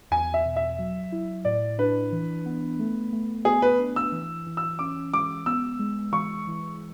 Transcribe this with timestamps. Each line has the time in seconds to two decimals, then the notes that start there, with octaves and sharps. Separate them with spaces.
0.11 E2 G#5
0.34 E5
0.45 B2
0.56 E5
0.79 F#3
1.12 E4
1.45 A2 D5
1.78 D4 B4
2.12 E3
2.46 B3
2.79 A3
3.13 A3
3.45 B3 G#4
3.62 B4
3.79 D4
3.96 E6
4.12 E3
4.46 E3
4.57 E6
4.79 C#4 D6
5.13 G#3 D6
5.46 B3 E6
5.79 G#3
6.13 E3 C#6
6.47 E3